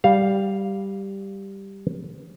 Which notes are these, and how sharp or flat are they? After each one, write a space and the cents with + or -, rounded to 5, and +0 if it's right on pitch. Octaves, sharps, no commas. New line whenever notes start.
G3 +0 F5 +0